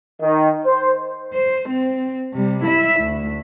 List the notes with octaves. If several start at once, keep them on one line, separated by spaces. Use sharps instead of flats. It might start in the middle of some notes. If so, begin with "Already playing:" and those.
D#3
C5
C5
C4
C3 G3
E4 E5
D2